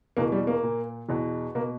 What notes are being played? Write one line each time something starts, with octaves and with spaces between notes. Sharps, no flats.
E2 B2 A#3
G3
A#3
A#2
E2 B2
B2 A#3